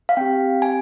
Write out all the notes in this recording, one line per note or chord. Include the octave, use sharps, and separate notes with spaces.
F5
C4 G4 G5
G#5